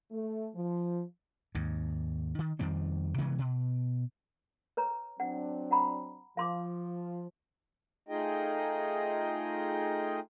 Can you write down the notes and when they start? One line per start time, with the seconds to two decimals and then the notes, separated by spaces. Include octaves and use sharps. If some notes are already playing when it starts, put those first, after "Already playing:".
0.12 A3
0.56 F3
1.55 D#2 G#2
2.39 D#3
2.59 F2 D#3 G3 C4
3.18 C3 E3 G#3 B3
3.39 B2
4.77 B4 C#5 A#5
5.20 F#3 C4 D4 F#5
5.71 F#5 A#5 B5
6.37 F3 F5 C6 D6
8.09 A3 D#4 F4 G#4 D#5 G5